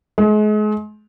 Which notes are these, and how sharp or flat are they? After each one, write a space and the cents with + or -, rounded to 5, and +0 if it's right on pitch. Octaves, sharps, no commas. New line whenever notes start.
G#3 +35